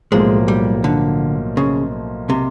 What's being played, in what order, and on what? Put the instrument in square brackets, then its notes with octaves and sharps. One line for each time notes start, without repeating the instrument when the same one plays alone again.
[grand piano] B1 A2 F3 A#3 [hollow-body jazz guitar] G#3
[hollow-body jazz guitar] G3
D3
C#3
C3